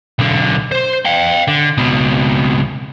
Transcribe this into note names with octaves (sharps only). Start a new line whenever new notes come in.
B1 D3
C5
F5 G5
D3
C#2 B2